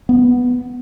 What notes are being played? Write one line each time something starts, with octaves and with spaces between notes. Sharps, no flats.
B3